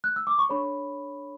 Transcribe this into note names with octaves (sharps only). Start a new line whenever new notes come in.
F#6
E6
D6
C#6
D4 A4 C#5 B5